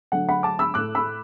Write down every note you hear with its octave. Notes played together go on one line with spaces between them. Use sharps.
D3 F#3 A3 F#5
F#5 B5
A5 D6
B5 E6
A2 A3 D6 F#6
B5 E6